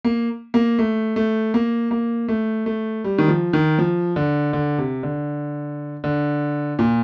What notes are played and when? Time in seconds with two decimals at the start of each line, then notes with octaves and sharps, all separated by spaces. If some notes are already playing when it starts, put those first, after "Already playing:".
0.04 A#3
0.54 A#3
0.79 A3
1.16 A3
1.54 A#3
1.91 A#3
2.28 A3
2.66 A3
3.04 G3
3.18 D#3
3.28 F3
3.53 D#3
3.79 F3
4.16 D3
4.53 D3
4.78 C3
5.03 D3
6.04 D3
6.79 A#2